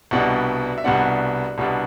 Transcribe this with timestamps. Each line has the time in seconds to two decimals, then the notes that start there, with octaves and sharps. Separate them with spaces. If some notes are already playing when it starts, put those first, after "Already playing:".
0.11 C2 B2 G3 B3 D4
0.78 E5
0.84 C2 B2 G3 B3 D4 F#5
1.58 C2 B2 G3 B3 D4